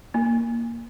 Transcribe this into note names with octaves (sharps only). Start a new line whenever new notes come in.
A#3